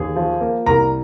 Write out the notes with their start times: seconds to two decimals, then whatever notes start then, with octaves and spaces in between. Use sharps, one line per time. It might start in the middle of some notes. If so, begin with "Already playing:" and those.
Already playing: D#2 G#4
0.16 F3
0.41 A#3
0.66 C2 A#4 A#5